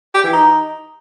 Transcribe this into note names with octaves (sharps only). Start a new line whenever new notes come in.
G4
E3
D#4